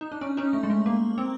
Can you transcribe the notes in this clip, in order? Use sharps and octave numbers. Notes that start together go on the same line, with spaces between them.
D#4
D4
C#4
C#4 D#4
A3
G#3
A3
A#3
C4